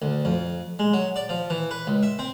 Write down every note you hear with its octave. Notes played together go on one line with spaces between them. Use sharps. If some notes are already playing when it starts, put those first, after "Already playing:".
D2
F2
G#3
F#3
D5
F3
E3
B4
C#2
E5
C4